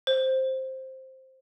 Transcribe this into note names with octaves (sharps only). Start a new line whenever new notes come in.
C5